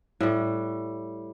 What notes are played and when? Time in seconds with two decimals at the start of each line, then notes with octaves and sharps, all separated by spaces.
0.20 A2 G3